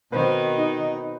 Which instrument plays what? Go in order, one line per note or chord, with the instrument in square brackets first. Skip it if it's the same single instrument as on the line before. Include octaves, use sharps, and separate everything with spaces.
[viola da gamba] B2 D#3 [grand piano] C4 B4 C5
[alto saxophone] D#4